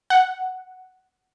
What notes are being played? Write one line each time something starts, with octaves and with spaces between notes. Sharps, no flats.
F#5